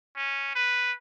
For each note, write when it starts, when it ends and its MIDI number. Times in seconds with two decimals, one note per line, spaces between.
0.16 0.51 61
0.55 0.93 71